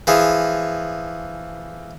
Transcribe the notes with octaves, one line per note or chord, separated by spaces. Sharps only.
E3 F3 G#4